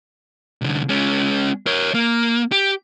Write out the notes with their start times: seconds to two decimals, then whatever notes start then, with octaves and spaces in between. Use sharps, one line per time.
0.61 C2 D3
0.89 G#3 C#4
1.66 A#4 C#5
1.94 A#3
2.52 G4